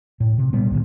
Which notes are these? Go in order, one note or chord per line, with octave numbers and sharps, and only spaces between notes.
A2
C3
A#2 G3 B3
C2 A#2 D#3